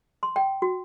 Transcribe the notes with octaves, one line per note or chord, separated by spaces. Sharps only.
C6
G5
F#4